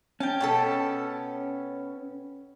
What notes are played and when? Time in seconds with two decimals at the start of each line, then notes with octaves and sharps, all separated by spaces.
0.20 C#4 G5 A5
0.40 B2 B3 A4